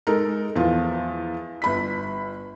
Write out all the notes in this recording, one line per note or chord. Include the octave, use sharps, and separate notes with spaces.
G#3 D#4 A4 A#4
E2 F3 F4
G1 B5 B6